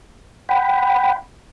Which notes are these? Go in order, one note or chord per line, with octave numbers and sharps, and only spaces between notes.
F#5 G5 B5